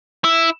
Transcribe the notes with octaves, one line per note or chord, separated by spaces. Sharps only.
E4